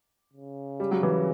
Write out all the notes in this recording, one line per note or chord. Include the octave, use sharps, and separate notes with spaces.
C#3
G3
F#3
E3 G3